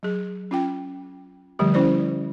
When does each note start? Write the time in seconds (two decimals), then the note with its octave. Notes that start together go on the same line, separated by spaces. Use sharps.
0.03 F#3 G#4
0.51 C#4 F4 G5
1.59 D3 F3 G3 A3 G4
1.74 C#4 E4 C5 D5